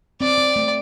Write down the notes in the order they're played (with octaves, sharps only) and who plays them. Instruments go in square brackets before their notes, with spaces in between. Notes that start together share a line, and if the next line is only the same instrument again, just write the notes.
[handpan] C4 [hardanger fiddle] D5
[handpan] C4
A3